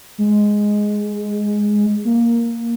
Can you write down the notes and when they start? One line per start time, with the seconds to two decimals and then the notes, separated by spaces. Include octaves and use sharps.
0.18 G#3
2.05 A#3